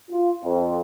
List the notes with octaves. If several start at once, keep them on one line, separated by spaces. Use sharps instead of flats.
F4
F2